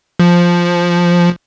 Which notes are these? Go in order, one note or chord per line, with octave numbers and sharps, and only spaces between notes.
F3